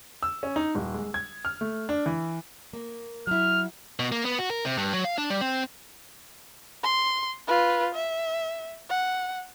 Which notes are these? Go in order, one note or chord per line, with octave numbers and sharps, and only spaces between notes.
E6
C#4
D#4
D#1
G#3
G#6
F6
A3
D4
E3
A#3
F#3 E4 F6
B2
A#3
B3
F#4
A#4
C3
G2
F#3
F5
D4
G3
C4
C6
F4 B4
E5
F#5